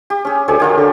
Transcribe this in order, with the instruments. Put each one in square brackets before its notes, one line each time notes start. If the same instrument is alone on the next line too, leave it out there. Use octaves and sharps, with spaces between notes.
[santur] G4
C#4 G#4
[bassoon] D2 [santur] G4 G#4 C#5
[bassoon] D#3 [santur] F#3 F4 G4
[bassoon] D3